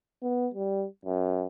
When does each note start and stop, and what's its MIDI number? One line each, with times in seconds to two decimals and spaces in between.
0.23 0.49 59
0.54 0.86 55
1.05 1.47 42